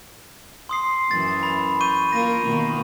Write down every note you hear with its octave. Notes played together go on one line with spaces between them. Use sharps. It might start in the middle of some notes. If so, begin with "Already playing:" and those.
C6 D#6 C7
F#2 E3 A6
B5
C#6 G6 D#7
A#3 F4 A#4 A#6 D#7
B2 D#3 A#3